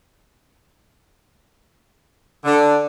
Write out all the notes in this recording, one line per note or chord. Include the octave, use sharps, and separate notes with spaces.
D3